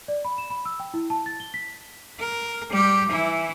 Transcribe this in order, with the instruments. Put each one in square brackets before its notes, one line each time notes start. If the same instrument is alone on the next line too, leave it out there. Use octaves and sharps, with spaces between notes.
[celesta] D5
B5
E7
B5
E6
G5
E4
A5
A6
G7
B6
[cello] A#4
G3 G4
E3 E4